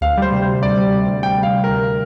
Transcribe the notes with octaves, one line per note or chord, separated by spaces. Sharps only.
D2 F5
G3
C5
C3
C5
D2
D2 D5
G3
C3
D2
D2 G5
G3 F5
C3
D2 A#4